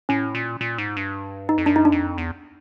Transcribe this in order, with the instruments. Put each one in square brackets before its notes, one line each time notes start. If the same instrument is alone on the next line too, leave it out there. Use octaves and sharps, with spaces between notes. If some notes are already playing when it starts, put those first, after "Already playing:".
[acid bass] A2 [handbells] C#4
[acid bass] A#2
A#2
G#2
G2
[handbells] D#4
[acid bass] F2
[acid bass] F#2 [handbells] D4
[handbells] D#4
D4
[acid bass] F2
E2